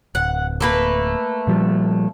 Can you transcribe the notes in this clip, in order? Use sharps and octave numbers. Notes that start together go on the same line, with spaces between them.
D1 F#5
A3 A#3 B4
A#2 F3 G3